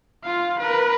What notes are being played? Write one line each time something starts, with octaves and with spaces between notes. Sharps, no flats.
F4 F5
A#4 B4